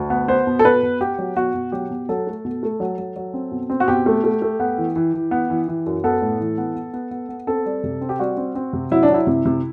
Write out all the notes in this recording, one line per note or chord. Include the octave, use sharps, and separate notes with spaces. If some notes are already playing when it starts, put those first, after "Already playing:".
Already playing: D2
B3
B3 C5
B2
A4
B2 B4
B2
B3 G4
F#3
B2 F#4
B2
F#3 G4
B2
F#3 A4
A3
B2
A3
F#3
F#3
F#3
C4
B2
C4
F#4
B2 G4
A3
A3
A3
B3
E3
E3
E3
B3
E3
E3
F#2
B3 A4
A2
E3
B3
B3
B3
B3
B3
C4 A4
G3
C3
C4
G4
G3 F#4
C4
C4
C3
F#3 E4
D4
F#3
E4
C3
C3